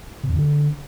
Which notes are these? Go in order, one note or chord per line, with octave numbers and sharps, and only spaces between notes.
C3
E2
D3